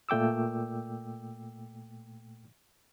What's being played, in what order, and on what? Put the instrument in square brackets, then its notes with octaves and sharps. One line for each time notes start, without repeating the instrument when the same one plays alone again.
[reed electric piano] A#2 A3 G5 D6 E6